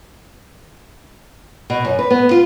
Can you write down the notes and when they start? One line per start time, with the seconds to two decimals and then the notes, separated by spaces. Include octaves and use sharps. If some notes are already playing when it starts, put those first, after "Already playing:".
1.70 B2
1.85 F#2
1.99 B4
2.11 B3
2.31 F4